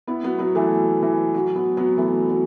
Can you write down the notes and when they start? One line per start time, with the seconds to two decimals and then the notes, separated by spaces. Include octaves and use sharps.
0.07 B3 E4
0.24 F#3 B3
0.39 F#3 B3
0.55 E3 A3
1.02 E3
1.34 F#3
1.55 F#3 B3
1.77 F#3 B3
1.97 E3 A3
2.30 F#3